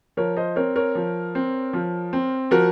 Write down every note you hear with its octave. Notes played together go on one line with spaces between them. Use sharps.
F3 A#4 C#5
C5 D#5
C4 A#4 C#5
A#4 C#5
F3
C4
F3
C4
F3 F#4 A#4